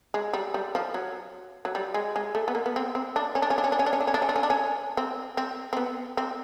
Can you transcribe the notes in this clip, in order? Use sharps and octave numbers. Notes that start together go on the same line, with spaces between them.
G#3
G3
G3
F3
F#3
F#3
G3
G#3
G#3
A3
B3
A#3
B3
C4
C4
D4
C#4
D4
C#4
D4
C#4
D4
C#4
D4
C#4
D4
C#4
D4
C#4
D4
C#4
D4
C#4
C4
C4
C4
B3
C4